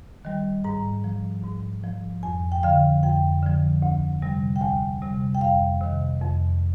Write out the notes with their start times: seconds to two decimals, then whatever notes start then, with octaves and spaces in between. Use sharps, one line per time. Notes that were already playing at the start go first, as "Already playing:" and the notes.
0.25 D#3 G3
0.64 G#2 A#5
1.04 F3
1.44 G#2
1.84 F3
2.23 F2 G#5
2.52 G5
2.63 D3 F3 F5
3.03 F2 G5
3.42 D3 F3
3.82 D2
4.22 C3 G3
4.56 G5
4.61 D2 G#5
5.02 C3 G3
5.35 G5
5.41 F2 F5
5.81 C3 D#3
6.21 F2